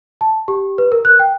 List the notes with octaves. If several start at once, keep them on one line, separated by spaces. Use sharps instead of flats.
A5
G4
B4
A#4
F#6
G5